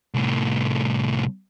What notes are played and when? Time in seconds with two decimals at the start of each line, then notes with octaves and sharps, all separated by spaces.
0.14 C2 A2